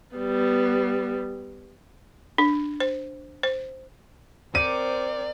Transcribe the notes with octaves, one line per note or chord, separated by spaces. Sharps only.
G3 B3
D4
C5
C5
C4 A#4 C5 D5 D6 C#7 D#7